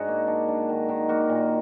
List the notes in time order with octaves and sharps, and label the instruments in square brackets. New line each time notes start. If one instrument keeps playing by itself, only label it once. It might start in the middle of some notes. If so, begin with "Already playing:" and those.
Already playing: [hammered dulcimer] G#2 D4 F#4 G#4
A#3
D4
D4
D#3
D#3
A#3 F#4
A#2